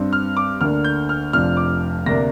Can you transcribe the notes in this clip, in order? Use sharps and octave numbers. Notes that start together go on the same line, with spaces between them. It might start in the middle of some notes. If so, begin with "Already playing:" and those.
Already playing: G2 G3 C4
F6
D6
D2 D3 A#3 D4 F6
G6
F6
F1 F2 F3 D4 F6
D6
D2 C3 A#3 D4 A#6